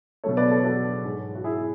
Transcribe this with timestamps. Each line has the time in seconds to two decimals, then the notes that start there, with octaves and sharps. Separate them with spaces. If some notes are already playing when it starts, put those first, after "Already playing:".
0.24 B2 F#3 A3 A4 C#5
0.37 B4 D5
0.51 A4 C#5
0.64 F#4 A4
1.05 G#2 G#3
1.35 F#4
1.44 E4 G#4